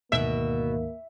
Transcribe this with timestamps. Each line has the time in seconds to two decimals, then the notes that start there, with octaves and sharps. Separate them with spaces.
0.12 D2 G#2 B2 D#3 A#3 E5